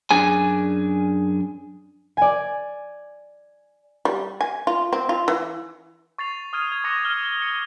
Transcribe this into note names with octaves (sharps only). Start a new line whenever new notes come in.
F#2 D4 G#4 G#5
D5 G#5
G3
G#5
F4
C4
F4
E3
C#6 A6 C7 F7
D#6 F6 G#6 D#7
G#6
C#6 D6 F#6 A#6 C#7 F7
F6 G7
C#7